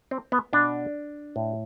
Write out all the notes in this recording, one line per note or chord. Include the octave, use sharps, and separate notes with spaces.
C4
B3
B2 D4
A2